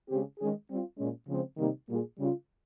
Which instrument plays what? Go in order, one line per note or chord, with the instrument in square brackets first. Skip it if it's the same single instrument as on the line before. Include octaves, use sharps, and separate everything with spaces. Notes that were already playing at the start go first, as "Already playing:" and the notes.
[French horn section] C#3 G#3 C4 G4
D#3 G#3 C#4 G#4
G3 C4 F4
A#2 G#3 C#4
C#3 F3 G#3 C4
C3 D#3 G3 A#3 D#4
A#2 G3 A#3 F4 G#4
C#3 G3 C#4 F4